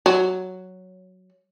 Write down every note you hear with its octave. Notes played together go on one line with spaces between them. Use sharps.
F#3